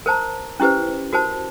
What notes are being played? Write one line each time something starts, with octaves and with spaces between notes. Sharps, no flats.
A#4 C5 A5 A#5
C#4 E4 G4 B4 C5
F#4 A#4 C5 A5